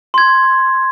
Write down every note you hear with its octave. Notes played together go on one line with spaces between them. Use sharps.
C6 G#6